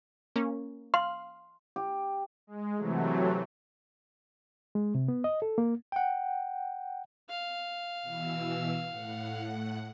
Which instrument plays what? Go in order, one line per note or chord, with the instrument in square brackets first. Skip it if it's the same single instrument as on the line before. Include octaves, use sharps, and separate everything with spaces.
[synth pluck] A#3 C#4
[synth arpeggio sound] F5 [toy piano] C6
[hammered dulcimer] G4
[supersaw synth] G#3
C3 E3 F#3 A3
[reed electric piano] G#3
C3
B3
D#5
A4
A#3
[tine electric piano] F#5 G5
[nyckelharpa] F5
[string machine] B2 E3 E6
A2 F#5